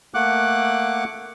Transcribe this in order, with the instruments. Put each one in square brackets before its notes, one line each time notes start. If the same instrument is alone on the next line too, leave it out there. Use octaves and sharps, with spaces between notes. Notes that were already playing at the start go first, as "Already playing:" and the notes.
[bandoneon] A3 A#3 F#5 D6 F#6